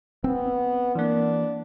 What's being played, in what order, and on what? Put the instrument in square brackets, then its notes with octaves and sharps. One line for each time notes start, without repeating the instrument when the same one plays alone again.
[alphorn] B3 [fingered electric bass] C4
[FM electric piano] E3 A#3 [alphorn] D4